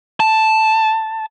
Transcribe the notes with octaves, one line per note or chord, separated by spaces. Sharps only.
A5